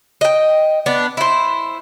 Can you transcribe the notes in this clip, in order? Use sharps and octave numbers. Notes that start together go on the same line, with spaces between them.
D#5 G5
B3 D4
E4 C5